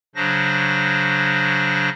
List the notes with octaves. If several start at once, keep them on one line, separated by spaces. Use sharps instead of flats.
C#3 F#3 D4 C5 A#6